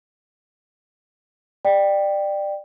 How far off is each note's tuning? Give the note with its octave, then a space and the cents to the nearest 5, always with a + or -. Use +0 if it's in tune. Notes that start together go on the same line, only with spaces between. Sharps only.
D5 +25 G5 +0